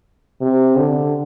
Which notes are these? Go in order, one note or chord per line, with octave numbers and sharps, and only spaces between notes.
C3
D3